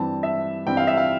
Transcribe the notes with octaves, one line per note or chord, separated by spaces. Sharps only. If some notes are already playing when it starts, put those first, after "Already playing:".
Already playing: G2 E3 G3 C4 A5
E5
G2 E3 G3 C4 G5
F5
E5
F5